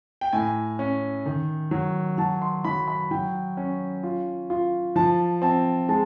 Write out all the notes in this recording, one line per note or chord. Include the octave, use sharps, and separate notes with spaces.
G5
A2 G#5
C#4
D#3
F#3
F#3 A5
C6
F#3 B5
B5
F#3 G5
C#4
F4
F4
F3 A5
C4 A5
G#3 A5